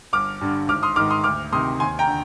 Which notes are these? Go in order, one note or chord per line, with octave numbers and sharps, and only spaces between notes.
G1 D6 F6
G2 D3
G#1 D6 F6
C6 D#6
G#2 D#3 D6 F6
C6 D#6
D2 D6 F6
C3 D#3 C6 D#6
D#2 G#5 C6
G5 A#5
D3